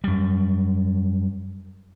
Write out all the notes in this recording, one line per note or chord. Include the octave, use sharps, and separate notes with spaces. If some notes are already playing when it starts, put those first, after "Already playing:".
F#2 G3